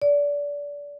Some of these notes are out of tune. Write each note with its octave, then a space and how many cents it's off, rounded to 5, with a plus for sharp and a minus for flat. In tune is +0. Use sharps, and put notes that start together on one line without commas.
D5 -25